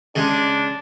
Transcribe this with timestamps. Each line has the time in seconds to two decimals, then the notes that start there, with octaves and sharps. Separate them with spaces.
0.16 C#3 G#3 D4